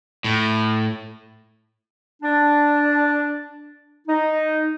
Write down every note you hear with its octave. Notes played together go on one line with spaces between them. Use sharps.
A2
D4
D#4